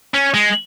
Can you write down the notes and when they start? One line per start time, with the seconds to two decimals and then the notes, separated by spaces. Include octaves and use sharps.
0.14 C#4
0.34 G#3